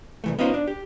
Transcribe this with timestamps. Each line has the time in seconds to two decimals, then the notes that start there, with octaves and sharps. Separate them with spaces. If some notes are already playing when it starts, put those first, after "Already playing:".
0.24 C2 E3 A3
0.39 B3 C#4 D#4 F4 C5
0.54 D4
0.68 G4